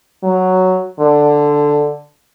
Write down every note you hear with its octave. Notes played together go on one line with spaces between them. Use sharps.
F#3
D3